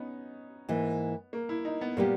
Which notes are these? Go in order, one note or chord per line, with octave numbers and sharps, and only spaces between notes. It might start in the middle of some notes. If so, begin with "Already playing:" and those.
Already playing: B3 C#4 D#4
G#2 E3 A#3
A#3
E4
D#4
B3
A#2 G3 A#3 B3 G4